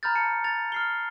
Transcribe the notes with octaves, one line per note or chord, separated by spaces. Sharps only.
A#5 B5 F6 G6 A6
A5 C#7
A6 F7
F6 C7 G7